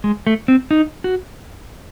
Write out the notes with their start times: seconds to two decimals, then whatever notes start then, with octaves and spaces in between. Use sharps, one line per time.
0.04 G#3
0.27 A3
0.48 C4
0.71 D#4
1.04 F#4